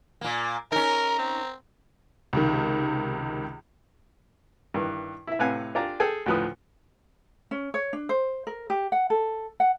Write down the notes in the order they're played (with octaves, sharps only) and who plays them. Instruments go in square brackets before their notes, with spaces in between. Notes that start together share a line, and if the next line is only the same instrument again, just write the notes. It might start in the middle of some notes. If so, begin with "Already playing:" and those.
[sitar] A#2 A#3
[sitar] C#4 D#4 [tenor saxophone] A#4 [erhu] A#5
[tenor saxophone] C4
[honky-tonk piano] C#2 C3 D#3
[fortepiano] G2 D#3 E3
E4 E5
A2 C3 B4 F5 F#5 G#5
D4 F4 G4 D5 G#5 A#5
G#4 A4 G5 G#5
D2 A2 F3 B4 D#6
[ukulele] C#4
C#5
D4
C5
A#4
G4
F#5
A4
F#5